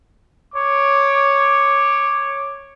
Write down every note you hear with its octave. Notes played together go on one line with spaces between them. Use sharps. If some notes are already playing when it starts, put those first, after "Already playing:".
C#5 D6